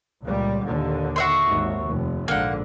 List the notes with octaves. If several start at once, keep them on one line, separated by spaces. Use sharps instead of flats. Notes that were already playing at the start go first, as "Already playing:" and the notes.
C#2 A#2 G3
D#2 A#2 D3
F#4 E5 C6
G#1 D#2
F1
A#1 G#2 D3 A#3 F#5